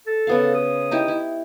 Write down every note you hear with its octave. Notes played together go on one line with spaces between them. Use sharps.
A4
C#3 B3 F5
D#6
D#4 E4 G4
E4